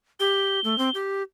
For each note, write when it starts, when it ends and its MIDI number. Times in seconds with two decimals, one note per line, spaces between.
0.20 0.60 67
0.20 0.95 103
0.64 0.77 57
0.78 0.90 60
0.95 1.23 67